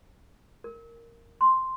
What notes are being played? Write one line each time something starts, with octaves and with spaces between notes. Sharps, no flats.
A#4
C6